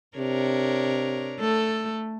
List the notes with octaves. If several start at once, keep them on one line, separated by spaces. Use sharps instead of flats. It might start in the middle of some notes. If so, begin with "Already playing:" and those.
C3 D4 A#4 C#5
A3 A4